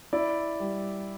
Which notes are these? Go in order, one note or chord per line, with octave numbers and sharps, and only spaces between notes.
E4 D5
G3